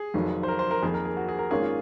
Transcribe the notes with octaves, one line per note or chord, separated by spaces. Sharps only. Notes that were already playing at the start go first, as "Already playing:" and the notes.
Already playing: G#4
F1 F2 D#3 F#3
C5
A#4
C5
A#4
F2 D#3 A#3 G#4
A#4
G#4
F#4
G#4
A#4
G#1 G#2 D#3 A#3 C#4 G#4
F4